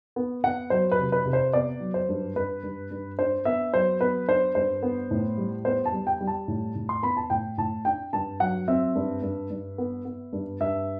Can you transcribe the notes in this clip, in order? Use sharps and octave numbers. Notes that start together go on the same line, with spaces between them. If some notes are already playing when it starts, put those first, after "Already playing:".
B3
B3 F#5
F#3 C5
B4
C3
B4
C3
C5
B3 D5
F#3
C5
G2
G2 B4
G2
G2
D4 C5
B3 E5
F#3 C5
B3 B4
D4 C5
G2 C5
B3
A2
G3
B3 C5
A5
G3
G5
G3
A5
A2
A2
C6
B3 B5
A5
A2 G5
A2 A5
D4 G5
G2 A5
F#3 F#5
C4 E5
G2
G2
G2
B3
B3
G2
G2 E5